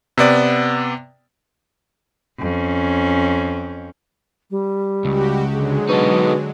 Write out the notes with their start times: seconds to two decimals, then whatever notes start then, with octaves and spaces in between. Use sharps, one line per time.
0.18 C3 B3 D5
2.39 F2 C#4
4.51 G3
5.05 C#2 F#4 G4
5.52 D3 F#3 G#3 G#4
5.89 B2 D#4 A4